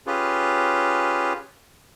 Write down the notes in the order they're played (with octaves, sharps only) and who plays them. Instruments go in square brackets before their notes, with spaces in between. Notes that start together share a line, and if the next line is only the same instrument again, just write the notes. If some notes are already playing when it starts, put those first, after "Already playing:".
[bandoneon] C#4 F4 G4 G#4 B4